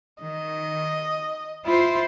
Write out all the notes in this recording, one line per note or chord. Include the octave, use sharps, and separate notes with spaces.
D#3 D#5
E4 F4 C5